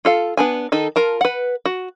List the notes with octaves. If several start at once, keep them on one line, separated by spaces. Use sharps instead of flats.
F4 A4 F5
B3 D4 G#5
D#3 D#4 A4
F4 A#4 A5
B4 F#5
F#4